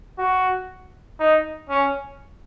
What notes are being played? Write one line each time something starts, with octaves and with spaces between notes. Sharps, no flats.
F#4
D#4
C#4